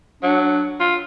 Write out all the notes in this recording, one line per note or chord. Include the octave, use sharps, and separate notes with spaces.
F#3 D4
F4